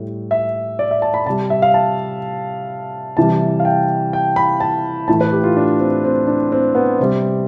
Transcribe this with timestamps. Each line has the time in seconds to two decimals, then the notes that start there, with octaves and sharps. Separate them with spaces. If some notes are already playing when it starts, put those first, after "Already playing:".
Already playing: A2 G3
0.31 E5
0.79 D5
0.91 E5
1.02 A5
1.14 B5
1.26 C3 A5
1.30 G3
1.50 E5
1.62 F5
1.74 A5
3.17 C3 E3 G3 A5
3.60 F5
3.65 G5
4.13 G5
4.36 B5
4.60 A5
5.08 A2 E3 A3 A5
5.21 B4
5.32 G4
5.43 F4
5.57 D4
5.80 C4
6.04 C4
6.27 D4
6.52 C4
6.75 B3
6.99 C3 G3 C4